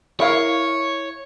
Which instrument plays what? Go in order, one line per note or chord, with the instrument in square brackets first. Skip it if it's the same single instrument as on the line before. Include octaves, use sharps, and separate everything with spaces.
[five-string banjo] E4 A#4 F5 [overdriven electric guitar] C#5